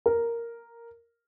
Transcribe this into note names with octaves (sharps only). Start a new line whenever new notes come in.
A#4